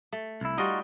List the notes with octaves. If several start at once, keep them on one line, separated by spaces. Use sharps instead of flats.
A3
C2 E4
G3 D#4 F4 F#4 D#5 G5